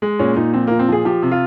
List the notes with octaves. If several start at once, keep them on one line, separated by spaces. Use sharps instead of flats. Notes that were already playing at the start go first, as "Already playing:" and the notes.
G#3
A#2 C#4
A#2 D#4
F3 C4
A#2 A#3
C4
F3 G#4
F3 G4
C3
F4